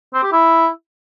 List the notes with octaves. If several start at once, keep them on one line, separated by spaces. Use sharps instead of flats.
C4
G4
E4